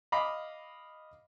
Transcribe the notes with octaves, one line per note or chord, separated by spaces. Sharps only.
D#5 F5 B5 D6